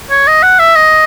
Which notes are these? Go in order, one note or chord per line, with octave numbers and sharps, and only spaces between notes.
C#5
D#5
F#5
E5
D#5